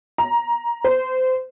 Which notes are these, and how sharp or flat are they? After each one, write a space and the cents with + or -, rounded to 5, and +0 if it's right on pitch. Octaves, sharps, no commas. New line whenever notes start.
A#5 +20
C5 -25